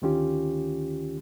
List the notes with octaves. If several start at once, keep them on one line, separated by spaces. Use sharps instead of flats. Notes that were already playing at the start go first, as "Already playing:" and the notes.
D2 D3 D#3 C#4 F4 G4